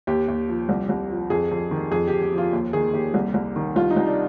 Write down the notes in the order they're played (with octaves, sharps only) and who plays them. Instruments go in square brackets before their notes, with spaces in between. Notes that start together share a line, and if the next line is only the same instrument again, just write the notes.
[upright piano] D#2 G4
D#2
F3
C2
C2
F3
F2 G#4
F2
D#3
F2 G#4
F2 G4
G4
F3
F4
D#2
D#3 G#4
D#2 G4
C2
C2
D#3
C2 F4
D#4
C2
D4